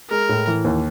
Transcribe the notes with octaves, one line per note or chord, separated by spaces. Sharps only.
G#3 A#4
A2
E3
D#2